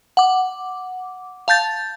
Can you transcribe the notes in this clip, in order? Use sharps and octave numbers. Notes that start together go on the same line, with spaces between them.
F#5 D6
F5 A5 G6 A6